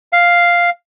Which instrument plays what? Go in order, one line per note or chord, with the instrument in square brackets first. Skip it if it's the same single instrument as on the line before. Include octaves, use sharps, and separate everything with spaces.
[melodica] F5